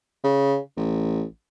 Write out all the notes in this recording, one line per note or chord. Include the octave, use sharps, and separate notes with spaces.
C#3
A1